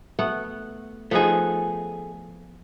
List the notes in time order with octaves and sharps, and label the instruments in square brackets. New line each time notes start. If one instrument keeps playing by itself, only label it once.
[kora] A3 B3 F#5
[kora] F3 B3 D#4 [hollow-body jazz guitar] A3 G#4